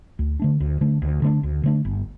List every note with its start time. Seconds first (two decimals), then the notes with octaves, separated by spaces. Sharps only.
0.19 D2
0.40 D3 A3 D4
0.60 D2
0.81 D3 A3 D4
1.02 D2
1.22 D3 A3 D4
1.43 D2
1.63 D3 A3 D4
1.85 G1